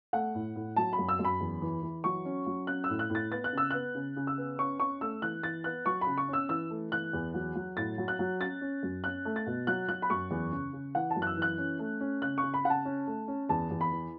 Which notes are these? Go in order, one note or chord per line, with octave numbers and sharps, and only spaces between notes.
A3 F#5
A2
A2
F#3 A5
B5
F#2
E6
F#2
B5
E2
E3
E3
F#3 C#6
C#4
F#3
C#4 F#6
E6
A2
F#6
A2
A6
B3 A6
F#6
C#3 E6
B3 F#6
C#3
C#3
E6
B3
C#4 C#6
C#4 C#6
A3 E6
E3 F#6
E3 A6
B3 F#6
F#3 C#6
B5
C#3
C#6
C#4 E6
E3 E6
A3
E3 F#6
E2
F#3
F#3
A2 A6
F#3
F#6
F#3
C#4 A6
C#4
F#2
C#4 F#6
A3
A6
B2
F#3 F#6
F#3 F#6
B5
F#2 C#6
E2
C#3
C#3
E3 F#5
A5
F#2
F#6
E6
E3
F#6
C#4
A3
C#4
C#3 F#6
C#6
C#3
B5
C#3 F#5
A5
C#4
A3
C#4
E2 A5
E2
B5
E3